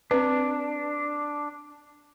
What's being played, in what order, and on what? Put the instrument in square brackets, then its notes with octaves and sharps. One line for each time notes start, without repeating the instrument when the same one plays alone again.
[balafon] C4 B4 [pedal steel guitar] D4